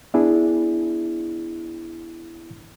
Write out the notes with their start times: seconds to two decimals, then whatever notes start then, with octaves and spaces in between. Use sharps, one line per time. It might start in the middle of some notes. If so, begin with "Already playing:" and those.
0.14 B3 D4 E4 G#4